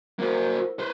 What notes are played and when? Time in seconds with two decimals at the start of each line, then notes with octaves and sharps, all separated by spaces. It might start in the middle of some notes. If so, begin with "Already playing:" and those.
0.19 A#3 F#4 A#4 C5 F5
0.68 E4
0.79 B4 C5